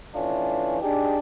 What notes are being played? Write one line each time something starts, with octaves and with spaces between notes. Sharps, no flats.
E3 A3 C#4 D4 F4
D4 D#4 G4 G#4